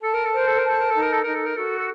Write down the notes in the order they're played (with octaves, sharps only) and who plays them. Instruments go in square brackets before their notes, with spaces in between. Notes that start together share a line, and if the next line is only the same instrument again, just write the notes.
[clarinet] A4 [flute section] A5
[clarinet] A#4
A4
[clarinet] A#4 [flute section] C5
[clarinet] A4
A#4
[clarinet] A4 [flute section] A5
[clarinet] A#4
[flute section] D#4 [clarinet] A4
[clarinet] A#4
A4
[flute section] D#4 [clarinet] A#4
[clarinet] A4
A#4
[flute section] F#4 [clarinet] A4
[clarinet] A4